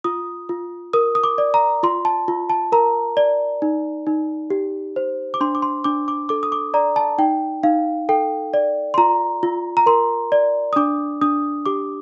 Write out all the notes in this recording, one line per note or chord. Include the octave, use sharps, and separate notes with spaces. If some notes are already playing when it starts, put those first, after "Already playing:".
F4 D#6
F4
A#4 D#6
D#6
D6
D5
A#5
F4 C6
A5
F4
A5
A#4 A#5
D5
D#4
D#4
G4
C5
D6
D4 C6
D6
C6
D4 D6
D6
A4 D6
D#6
D6
D5 A#5
A5
D#4 G5
D#4 F5
A4 G5
D5
C6
F4 A#5
F4
A#5
A#4 C6
D5
D#6
D4 D6
D4 D#6
G4 D6